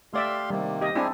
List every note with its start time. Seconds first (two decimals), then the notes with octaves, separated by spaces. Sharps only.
0.14 A3 G4 D5 E5 F5 C6
0.50 C3 D#3 G3 A#3
0.81 G4 D#5
0.96 C4 D4 E4 G4 G#4 G#5